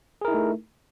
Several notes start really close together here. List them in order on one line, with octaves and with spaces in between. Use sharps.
G#4 A#4 E4 D#4 A3